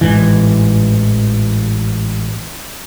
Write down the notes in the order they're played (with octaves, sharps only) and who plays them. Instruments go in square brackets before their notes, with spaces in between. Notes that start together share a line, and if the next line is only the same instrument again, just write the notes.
[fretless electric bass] A1 G#2 E3